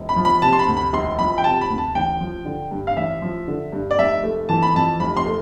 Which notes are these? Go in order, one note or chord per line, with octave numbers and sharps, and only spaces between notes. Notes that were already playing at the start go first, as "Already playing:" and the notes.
Already playing: E1
B5
F3
B5
C3 A5
C6
B5
D2
B5
E1 C6
F3 B5
G5
C3 A5
B5
D2
A5
A1 G5
F3
D3
G2
F5
A1 E5
F3
D3
G2
D5
F1 E5
A3
E3 A5
B5
F2 A5
F1 B5
C6
A3